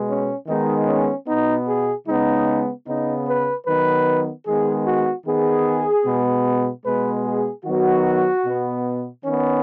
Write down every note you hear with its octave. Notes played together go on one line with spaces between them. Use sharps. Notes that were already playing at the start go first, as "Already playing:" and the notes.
Already playing: B2 G#3 B3
C#4
D#3 G#3 B3 D#4
C#4
B2 B3 D#4
G#4
C#3 G#3 B3 D#4
C#3 B3 D#4
B4
D#3 F#3 B3 B4
D#3 G#3 B3 G#4
F#4
D#3 B3 G#4
B2 G#3 B3
B2 G#3 B3 B4
G#4
D#3 F#3 B3 F#4
B2 B3
D#3 B3 C#4